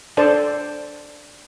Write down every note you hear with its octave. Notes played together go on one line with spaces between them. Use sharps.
D4 A4 C5 D5 A5